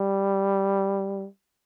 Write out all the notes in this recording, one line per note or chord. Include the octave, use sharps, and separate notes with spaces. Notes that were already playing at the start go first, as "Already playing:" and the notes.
Already playing: G3